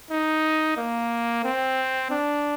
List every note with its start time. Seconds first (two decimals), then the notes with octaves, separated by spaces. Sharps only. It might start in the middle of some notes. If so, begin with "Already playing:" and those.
0.11 D#4
0.77 A#3
1.44 C4
2.11 D4